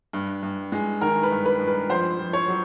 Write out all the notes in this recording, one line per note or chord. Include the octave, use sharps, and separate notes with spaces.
G2
G2
G#3
D#3 A#4
B4
G2
B4
G2
B4
F2 C5
F2
C#5
F#3